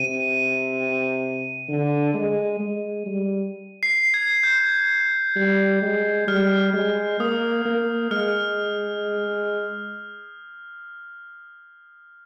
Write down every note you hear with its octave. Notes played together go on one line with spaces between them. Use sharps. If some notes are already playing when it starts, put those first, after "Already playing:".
Already playing: C3 D#7
D3
G#3
G#3
G3
C7
G#6
G6
G3
G#3
G3 F6
G#3
A#3 D#6
A#3
G#3 F6